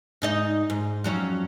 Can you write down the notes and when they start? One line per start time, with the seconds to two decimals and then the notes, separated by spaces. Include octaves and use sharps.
0.22 G#2 D#4 D#5
0.70 G#2
1.04 F2 F#3 C#4